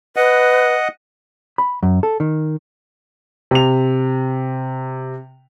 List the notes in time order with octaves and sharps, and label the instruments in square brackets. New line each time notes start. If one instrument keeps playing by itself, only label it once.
[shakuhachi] B4 [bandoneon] D#5 F#5
[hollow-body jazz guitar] B5
F#2
A4
D#3
[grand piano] C3 F7